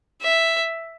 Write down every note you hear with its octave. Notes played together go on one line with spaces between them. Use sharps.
E5